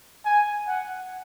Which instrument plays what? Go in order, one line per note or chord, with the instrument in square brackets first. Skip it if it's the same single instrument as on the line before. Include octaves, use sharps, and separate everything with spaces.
[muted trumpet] G#5
F#5